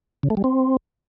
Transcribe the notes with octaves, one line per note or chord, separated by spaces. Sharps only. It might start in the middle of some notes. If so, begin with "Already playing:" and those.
C#3
A3
G3
C4